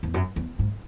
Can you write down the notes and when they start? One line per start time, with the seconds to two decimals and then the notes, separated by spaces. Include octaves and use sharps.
0.03 E2
0.14 F#2
0.36 E2
0.59 G#2